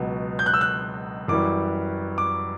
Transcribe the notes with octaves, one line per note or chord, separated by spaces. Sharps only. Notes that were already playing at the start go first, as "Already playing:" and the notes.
Already playing: C#2 B2 F#3
G6
F#6
E6
F#6
F#2 E3 G3 D6
D6